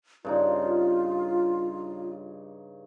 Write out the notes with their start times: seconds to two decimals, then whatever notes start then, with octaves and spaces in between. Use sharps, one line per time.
0.25 G2 C#3 D#4 F4